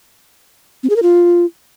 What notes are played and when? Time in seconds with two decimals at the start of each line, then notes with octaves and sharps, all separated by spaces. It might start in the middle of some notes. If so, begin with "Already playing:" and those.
0.83 C4
0.90 G#4
0.96 A#4
1.03 F4